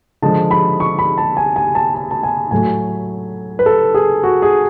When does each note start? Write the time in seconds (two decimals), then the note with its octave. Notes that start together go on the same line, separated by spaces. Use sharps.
0.22 D3 F3 G#3 A5
0.51 B5
0.80 C#6
0.99 B5
1.18 A5
1.37 G#5
1.56 G#5
1.75 A5
1.95 A5
2.11 A5
2.23 G#5
2.51 A2 F#3 A3 G#5
3.59 B4
3.66 A4
3.94 G#4
4.23 F#4
4.42 G#4